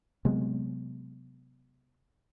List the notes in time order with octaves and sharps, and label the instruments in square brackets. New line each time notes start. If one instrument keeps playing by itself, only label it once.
[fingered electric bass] C3 F#3 G#3 B3